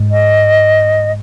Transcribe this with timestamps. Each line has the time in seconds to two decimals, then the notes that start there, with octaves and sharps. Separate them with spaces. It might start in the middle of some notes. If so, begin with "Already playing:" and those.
Already playing: G#2
0.11 D#5